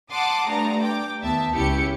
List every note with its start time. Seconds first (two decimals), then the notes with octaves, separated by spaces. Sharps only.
0.11 F#5 A5 C6 D6 D#6
0.49 G2 G3 A3 A#5
0.81 G5 D6
1.23 D#2 B3 E5 A5
1.54 C#2 C#4 E4 G4 C#7